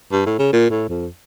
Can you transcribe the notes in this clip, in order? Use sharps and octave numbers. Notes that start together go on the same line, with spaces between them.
G2
A2
C#3
A#2
A2
F2